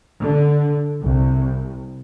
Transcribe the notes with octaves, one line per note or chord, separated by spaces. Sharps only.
D3
C2